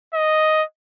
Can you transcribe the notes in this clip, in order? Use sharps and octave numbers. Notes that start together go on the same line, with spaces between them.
D#5